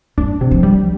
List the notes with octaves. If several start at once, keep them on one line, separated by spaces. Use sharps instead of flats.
G3 D4
C3
F3
G3